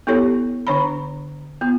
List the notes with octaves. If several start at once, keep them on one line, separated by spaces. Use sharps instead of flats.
B3 E4 G4 A4 C#5
D3 D4 C#5 A#5 B5
B3 F4